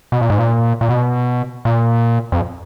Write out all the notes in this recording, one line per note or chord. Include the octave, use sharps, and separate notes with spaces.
B2
A#2
G#2
A#2
A#2
B2
A#2
F2